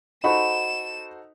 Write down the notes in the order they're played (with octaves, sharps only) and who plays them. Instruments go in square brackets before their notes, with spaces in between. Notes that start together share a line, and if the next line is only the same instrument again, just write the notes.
[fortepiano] D#4 [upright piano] F#4 A4 C5 [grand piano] F#5 B5 C#6 [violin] E7